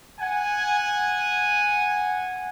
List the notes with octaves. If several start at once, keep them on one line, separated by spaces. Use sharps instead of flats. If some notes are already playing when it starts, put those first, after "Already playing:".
F#5 G#5